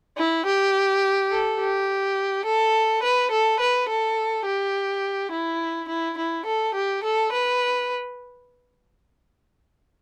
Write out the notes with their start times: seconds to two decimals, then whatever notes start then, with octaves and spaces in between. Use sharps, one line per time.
0.17 E4
0.46 G4
1.31 A4
1.60 G4
2.45 A4
3.03 B4
3.31 A4
3.60 B4
3.89 A4
4.46 G4
5.32 E4
5.88 E4
6.18 E4
6.46 A4
6.75 G4
7.03 A4
7.32 B4